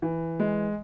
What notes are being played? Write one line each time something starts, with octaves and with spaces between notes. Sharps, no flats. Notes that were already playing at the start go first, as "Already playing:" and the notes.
E3
G#3